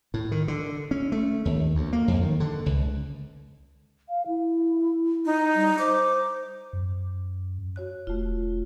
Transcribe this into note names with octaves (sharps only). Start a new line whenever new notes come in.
A2
D#3
D3
C#4
A3
D#2
D2
A#3
F2
D#3
D3
C#2
F5
E4
D#4
G3
C5 D6
F#2
F#4 C#5 F#6
E1 A3 F4